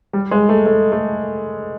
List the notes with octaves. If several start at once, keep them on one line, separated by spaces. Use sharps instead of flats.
G3
G#3
A3
A3
A3